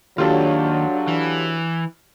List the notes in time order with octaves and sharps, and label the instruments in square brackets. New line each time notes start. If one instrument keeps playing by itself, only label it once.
[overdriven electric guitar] D#2 [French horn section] F#3 D4 [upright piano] F4 G4 A4
[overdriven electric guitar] E3